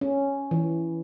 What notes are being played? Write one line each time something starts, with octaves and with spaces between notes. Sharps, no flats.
C#4
E3